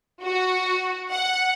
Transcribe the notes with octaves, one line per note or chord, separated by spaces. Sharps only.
F#4
F#5